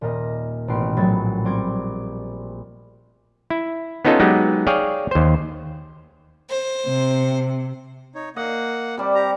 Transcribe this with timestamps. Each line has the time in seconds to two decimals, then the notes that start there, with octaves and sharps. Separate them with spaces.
0.01 D#1 A#2 A#4 D#5
0.68 A1 B2 B3 C#4 C6 D7
0.97 A#1 A2 F#3 B3 G#6 A6
1.45 G3 C4 D6 G#6 D7
3.50 E4
4.05 B3 C#4 D#4 F4 A4 D#5
4.20 F#3 G#3 B3 D#4 G4
4.67 G#4 C#5 D5 F5 G5
5.11 D#2 C5
6.49 C5
6.85 C3
8.15 D#4 C#5
8.36 A#3 D#5 F#5
8.97 C3 G3 D5
9.15 G4 A#5